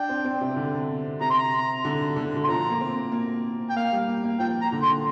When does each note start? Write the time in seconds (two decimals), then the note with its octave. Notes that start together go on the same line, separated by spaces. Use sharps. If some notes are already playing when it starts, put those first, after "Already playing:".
Already playing: D4 G5
0.09 C4
0.25 C4
0.41 C3
0.56 D3
1.21 C3 A#5
1.30 C6
1.38 A#5
1.85 D3
2.16 D3
2.36 D3
2.44 C6
2.48 F3 A#5
2.70 A#3
2.81 C4
3.12 A#3
3.70 G5
3.76 A#3 F5
3.92 G3
4.08 A#3
4.24 A#3
4.39 F3 G5
4.61 A#5
4.72 D3
4.82 C6